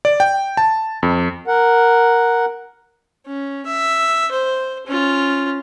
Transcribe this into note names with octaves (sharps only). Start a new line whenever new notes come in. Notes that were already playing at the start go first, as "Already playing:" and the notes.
D5
G5
A5
F2
A#4 F#5
C#4
E5
C5
C#4 F4